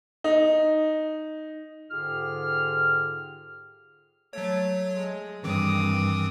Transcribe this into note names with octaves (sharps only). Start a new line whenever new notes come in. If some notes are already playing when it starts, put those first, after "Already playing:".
D#4
G#2 D3 F4 G4 G#4 F6
F#3 A3 C#5
G#3
G2 D#3 E3 C4 D6 D#6